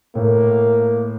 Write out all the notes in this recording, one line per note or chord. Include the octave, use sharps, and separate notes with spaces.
A2 A#3